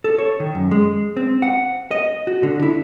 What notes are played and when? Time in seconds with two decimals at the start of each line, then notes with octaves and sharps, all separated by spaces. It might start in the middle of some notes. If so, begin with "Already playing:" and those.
0.04 A4
0.18 C#5
0.40 D#3
0.55 F#2
0.71 G#3
1.17 C4
1.42 F#5
1.91 D#5
2.27 F#4
2.43 D3
2.62 E4